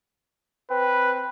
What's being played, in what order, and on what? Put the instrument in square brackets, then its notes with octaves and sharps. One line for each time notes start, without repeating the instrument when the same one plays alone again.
[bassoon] C4 [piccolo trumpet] B4